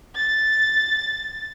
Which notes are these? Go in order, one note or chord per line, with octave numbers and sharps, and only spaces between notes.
A6